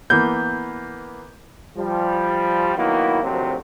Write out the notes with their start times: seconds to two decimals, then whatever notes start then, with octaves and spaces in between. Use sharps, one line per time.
0.10 E3 A#3 B3 G6
1.77 F3 G3
2.76 D#3 F#3 A#3 B3 E4
3.23 D2 C3 D#3 F3 F#3